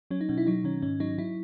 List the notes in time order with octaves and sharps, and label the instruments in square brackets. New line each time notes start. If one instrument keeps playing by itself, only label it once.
[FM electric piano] F#3 C#4
D#4
B2 C#4
E4
F#3 D#4
D#3 C#4
G#2 C#4
F#3 D#4
F#3 E4